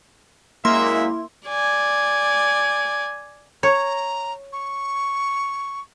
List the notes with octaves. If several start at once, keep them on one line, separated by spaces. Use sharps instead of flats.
F#2 G#3 A#3 E4 E5 C6
D5 G#5
C#5 A#5
C#6